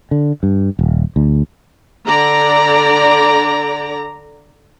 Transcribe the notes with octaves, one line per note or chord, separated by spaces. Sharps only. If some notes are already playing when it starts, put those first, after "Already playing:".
D3
G2
D#1
D2
D3 D5 A#5